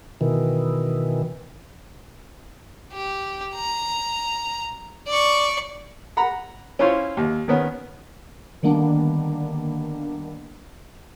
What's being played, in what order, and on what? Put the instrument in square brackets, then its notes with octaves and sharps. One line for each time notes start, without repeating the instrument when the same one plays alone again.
[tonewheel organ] B2 D#3 E3
[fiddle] G4
A#5
D5 C#6
[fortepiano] F#5 A#5 B5
C#4 E4 F4 C5 C#5
D#2
D#3 B3 C#4
[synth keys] D3 D#3 G3 A#3 B3 D4